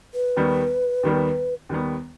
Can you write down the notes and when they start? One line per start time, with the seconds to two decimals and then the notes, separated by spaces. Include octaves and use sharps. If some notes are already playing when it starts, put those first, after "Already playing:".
0.14 B4
0.37 D#2 D#3 G3 B3
1.03 D#2 D#3 G3 B3
1.69 D#2 D#3 G3 B3